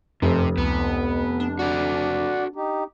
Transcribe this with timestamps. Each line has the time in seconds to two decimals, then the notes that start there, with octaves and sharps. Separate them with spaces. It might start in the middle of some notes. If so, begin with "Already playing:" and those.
0.22 F1 F#2 C3
0.58 C#2 B3
1.40 D4
1.59 F#4 A4 D5 F#5
2.56 D#4 G4